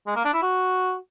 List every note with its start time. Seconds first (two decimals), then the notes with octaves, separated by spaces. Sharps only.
0.07 G#3
0.16 A#3
0.25 D4
0.34 E4
0.43 F#4